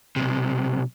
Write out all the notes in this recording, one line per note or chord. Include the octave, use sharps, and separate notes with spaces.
B1 C3